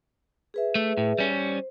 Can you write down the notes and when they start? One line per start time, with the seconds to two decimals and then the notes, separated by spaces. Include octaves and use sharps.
0.54 G#4 B4 E5
0.75 A3
0.97 A2
1.18 G3 C#4
1.31 C5